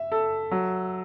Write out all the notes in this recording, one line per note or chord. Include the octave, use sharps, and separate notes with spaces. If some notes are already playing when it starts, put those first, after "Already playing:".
Already playing: E5
A4
F#3